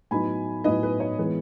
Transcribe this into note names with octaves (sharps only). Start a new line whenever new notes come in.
A2 F#3 B3 D#4 G#5 B5
A2 F#3 B3 D#4 B4 D#5
B4
C#5
E3 G#3 B3